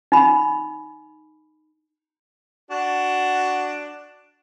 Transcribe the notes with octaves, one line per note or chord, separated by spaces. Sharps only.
D#4 B5
D4 F#4